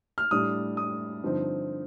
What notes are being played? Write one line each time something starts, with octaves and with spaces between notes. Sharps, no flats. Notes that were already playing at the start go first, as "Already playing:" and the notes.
F6
A2 G3 D4 D#6
D#6
G2 D3 F3 C4 D#4